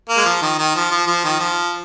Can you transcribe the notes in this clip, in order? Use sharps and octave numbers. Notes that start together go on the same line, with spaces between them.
A#3
G#3
F3
D#3
D#3
F3
F3
F3
D#3
F3